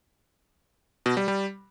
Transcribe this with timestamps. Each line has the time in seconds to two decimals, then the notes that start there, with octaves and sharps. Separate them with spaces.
1.06 B2
1.17 G3
1.28 G3